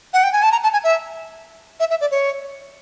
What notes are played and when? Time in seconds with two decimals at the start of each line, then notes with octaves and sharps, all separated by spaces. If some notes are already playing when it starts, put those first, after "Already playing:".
0.13 F#5
0.23 G5
0.32 G#5
0.43 A5
0.52 A#5
0.63 A5
0.73 G#5
0.84 E5
1.80 E5
1.90 E5
2.01 D5
2.11 C#5